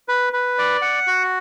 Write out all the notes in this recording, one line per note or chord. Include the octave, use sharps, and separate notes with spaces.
B4
B4
D5
F#5
F#4